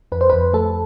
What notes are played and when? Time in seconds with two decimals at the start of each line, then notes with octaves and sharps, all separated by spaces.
0.12 F2 B4
0.21 C5
0.30 F2 B4
0.53 A3 A4